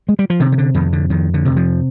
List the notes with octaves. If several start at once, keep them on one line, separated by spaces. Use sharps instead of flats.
G#3
G3
F3
C3 D#3
D#3
D3
F2 D#3
D3
F2 D#3
D3
C3
F3